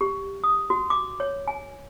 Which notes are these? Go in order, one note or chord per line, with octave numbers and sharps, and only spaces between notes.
G4
D#6
F#4
D6
C#5
G#5